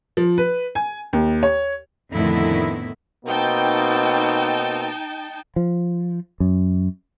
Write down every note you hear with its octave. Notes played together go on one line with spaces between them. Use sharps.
F3
B4
G#5
D#2
C#5
F2 A2 D3 D#3 B3 E4
B2 A#3 C4 D#4 G5 A5
F3
F#2